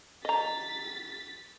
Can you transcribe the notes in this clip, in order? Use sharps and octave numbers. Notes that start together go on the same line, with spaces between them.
D#5 A#5 A6 B6